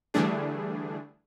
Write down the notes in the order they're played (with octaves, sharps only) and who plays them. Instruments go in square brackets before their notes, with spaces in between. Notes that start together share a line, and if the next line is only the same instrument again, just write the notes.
[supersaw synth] D3 E3 G3 A3 D4 G#4